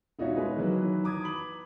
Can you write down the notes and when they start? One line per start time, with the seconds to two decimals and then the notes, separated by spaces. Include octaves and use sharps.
0.19 E1 D#4 F4 F#4 C#5 E5
0.36 G#3 B4
0.56 D#3 E3 F#3 B4
1.04 A#5 D6 D#6 G#6
1.23 B5 F#7